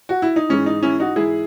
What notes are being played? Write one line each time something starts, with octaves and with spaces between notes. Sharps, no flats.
F#4
E4
D#4
G#2 E3 G#3 C#4
D#4
C#4 E4
D#4 F#4
G#2 E3 G#3 E4 G#4